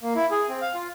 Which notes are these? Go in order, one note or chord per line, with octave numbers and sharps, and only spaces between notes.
A#3
E4
G#4
C4
F5
F4